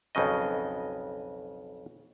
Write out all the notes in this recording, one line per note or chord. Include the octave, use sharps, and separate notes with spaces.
B1 F2 C#3 D#5